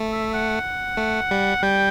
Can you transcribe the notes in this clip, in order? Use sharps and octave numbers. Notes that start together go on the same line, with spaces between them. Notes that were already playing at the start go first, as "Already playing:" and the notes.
Already playing: A3
E5
F#5
A3
G3
G3 G5